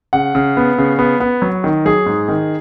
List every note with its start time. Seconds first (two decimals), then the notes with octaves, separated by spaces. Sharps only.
0.13 C#3 F#5
0.35 C#3
0.57 B3
0.78 C#3
0.99 B3
1.20 B3
1.42 F#3
1.64 D#3
1.85 F#3 G#4
2.06 G#2
2.28 D#3